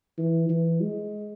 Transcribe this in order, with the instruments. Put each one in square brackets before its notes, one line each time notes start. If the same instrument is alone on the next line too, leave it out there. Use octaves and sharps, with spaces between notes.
[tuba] E3
E3
G#3